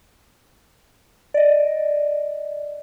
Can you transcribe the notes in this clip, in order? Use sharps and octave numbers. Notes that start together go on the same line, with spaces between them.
D5 D#5